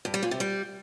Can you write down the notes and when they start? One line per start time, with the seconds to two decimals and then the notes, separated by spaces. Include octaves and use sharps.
0.05 G2
0.14 G3
0.23 A#2
0.31 C3
0.40 G3